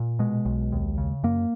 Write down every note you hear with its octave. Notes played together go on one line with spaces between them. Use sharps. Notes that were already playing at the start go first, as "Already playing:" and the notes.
Already playing: A#2
B2 G#3
B1
D#2
C#3
F#2 A#3